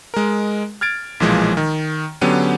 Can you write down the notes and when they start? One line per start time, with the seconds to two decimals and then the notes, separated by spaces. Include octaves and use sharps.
0.14 G#3 A#4
0.81 F6 G#6 A6 D7
1.20 B1 A#2 E3 F3 G#3
1.57 D#3
2.21 D3 F#3 B3 C#4 G4 D#7